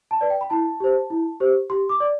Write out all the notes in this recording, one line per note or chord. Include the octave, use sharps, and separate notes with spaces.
A5
B4 D5
G5
B5
E4 A5
G4 C5
E4
G4 C5
G4 C6
D6
D5